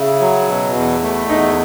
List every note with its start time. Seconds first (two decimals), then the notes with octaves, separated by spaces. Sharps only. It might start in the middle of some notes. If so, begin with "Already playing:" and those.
Already playing: C#3 E4
0.20 F#3
0.48 B2
0.75 E2
1.02 A3
1.29 E2 D#4